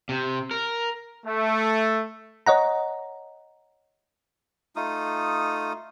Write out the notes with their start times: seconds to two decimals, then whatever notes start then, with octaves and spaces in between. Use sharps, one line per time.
0.09 C3
0.51 A#4
1.26 A3
2.46 C#5 D#5 F#5 A#5
4.76 A3 D#4 F4 D#6